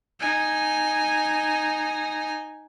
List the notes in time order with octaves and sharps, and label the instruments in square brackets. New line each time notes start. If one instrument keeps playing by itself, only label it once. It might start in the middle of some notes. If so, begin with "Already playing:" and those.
[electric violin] D#4 G#5